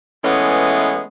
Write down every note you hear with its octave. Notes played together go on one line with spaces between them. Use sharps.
E3 G#3 A3 B3 C#4